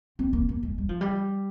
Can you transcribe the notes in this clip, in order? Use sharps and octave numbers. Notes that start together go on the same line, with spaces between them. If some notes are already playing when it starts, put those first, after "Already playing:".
C4
A#3
A#3
G#3
G3
F3
G3